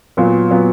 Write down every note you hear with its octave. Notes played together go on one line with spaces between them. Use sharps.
A#2 F#3 B3
A#2 F#3 B3